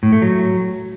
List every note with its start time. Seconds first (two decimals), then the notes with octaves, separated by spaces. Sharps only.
0.03 A2
0.12 A3
0.22 F#3